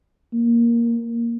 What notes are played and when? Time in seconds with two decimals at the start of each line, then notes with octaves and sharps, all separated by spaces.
0.33 A#3